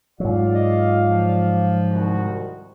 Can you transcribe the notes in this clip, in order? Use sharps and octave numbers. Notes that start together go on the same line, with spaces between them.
G#2 F#3 F4 D5 F5
D#5
F3
C2 D#3 F#4